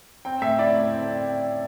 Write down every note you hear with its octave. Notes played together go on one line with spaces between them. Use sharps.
C4 G5
A2 E5
E4 D5
A3
C4